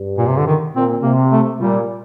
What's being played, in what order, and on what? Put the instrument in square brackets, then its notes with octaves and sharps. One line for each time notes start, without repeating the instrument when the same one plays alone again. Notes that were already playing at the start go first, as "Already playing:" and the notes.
Already playing: [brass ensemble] G2
[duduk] A#2
C3
D3
D#3
[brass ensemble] A#2 [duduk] C4
[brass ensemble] C3 [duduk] A#3
[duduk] A3
[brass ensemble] A#2 [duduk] G3